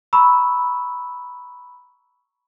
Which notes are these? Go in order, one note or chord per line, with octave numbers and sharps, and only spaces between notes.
A#5 B5 C#6 E6